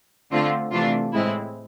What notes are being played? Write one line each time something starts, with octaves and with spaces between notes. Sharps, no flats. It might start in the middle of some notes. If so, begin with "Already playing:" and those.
D3 A3 C4 F4
C3 E3 A3 D4 F4
A2 G#3 C4 E4